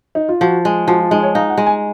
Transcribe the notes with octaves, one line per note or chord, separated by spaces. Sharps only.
D#4
F4
F3 F#4
G#3
F3 F#4
F4
G#3 D#4
C#5
D#4 F5
F#5
G#3
G#5